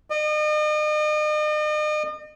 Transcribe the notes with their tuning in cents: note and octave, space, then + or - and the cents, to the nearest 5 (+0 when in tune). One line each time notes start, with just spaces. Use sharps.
D#5 -40